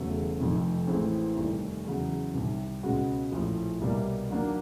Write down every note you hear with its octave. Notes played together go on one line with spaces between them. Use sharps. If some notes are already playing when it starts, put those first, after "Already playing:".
Already playing: E1 E2 C#3 F#3 A3
F1 F2 C3 D#3
A1 A2 E3 G#3 C4
F1 D#2 D#3 G3
E2 C#3 F#3
C2 C3 D#3
C#2 B2 G#3 C#4 F#4
A#1 A2 F3
C2 B2 G3 A#3
D#2 D#3 F#3 A#3 D4